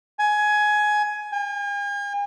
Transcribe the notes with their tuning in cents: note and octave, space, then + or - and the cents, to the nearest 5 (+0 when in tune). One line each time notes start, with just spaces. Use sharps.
G#5 +15
G#5 -45